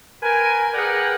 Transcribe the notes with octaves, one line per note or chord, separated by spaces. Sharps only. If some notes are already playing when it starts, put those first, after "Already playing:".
A#4 B4 G5 G#5
G#4 A#4 B4 D5 F#5 G5